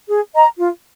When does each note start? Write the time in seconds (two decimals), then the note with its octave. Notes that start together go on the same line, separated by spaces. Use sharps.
0.09 G#4
0.34 D#5 A#5
0.58 F4